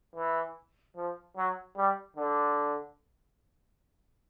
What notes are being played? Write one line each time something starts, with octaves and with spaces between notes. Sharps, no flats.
E3
F3
F#3
G3
D3